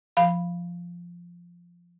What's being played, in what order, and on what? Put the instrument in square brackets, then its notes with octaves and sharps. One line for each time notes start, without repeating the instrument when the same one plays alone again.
[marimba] F3 F5 B5